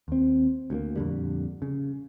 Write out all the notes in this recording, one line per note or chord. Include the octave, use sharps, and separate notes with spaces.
D#2 C4
D2 F#3 A#3
F2 A#2 D3 G3
C#3